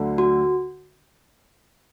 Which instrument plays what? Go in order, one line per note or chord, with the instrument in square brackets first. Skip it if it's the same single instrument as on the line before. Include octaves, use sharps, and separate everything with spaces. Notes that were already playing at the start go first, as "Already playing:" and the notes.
Already playing: [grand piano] D2 D3 F#3
[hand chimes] F#4